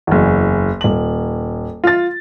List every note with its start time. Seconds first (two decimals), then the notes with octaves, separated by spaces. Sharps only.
0.07 F#1 E2
0.81 D#1 F#7
1.84 F4 A6